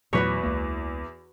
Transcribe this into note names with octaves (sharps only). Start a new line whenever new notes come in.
E2 A#2 F#3 A3 F#4 B4 C#5
C#2 A#3